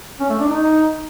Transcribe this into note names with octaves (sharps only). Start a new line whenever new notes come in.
C#4
A3
D4
D#4